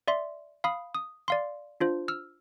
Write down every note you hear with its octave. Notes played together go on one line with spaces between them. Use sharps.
D5 E5 C6
F5 B5 D#6
D#6
D5 F5 C6
D4 F4 C5
E6 F6